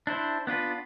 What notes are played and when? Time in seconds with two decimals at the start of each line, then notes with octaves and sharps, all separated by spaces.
0.07 D4 E4 C5
0.47 B3 D4 F4 B4